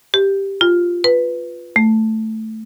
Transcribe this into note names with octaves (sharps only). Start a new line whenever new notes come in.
G4
F4
B4
A3